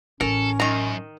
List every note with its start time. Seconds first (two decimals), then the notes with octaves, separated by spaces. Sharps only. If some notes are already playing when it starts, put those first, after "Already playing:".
0.21 A1 C#4 A4 A#4
0.60 F#2 D#3 A#5